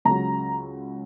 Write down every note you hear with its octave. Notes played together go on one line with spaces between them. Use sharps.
C#2 C#3 F#3 A#5